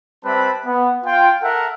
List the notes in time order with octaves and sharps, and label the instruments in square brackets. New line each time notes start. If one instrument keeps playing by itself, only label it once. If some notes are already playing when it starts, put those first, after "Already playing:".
[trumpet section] G3 C4 B4 E5 A5 B5
B3
F4 G5
A4 A#4 E5 F#5